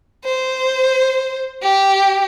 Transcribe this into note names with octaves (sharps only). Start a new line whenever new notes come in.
C5
G4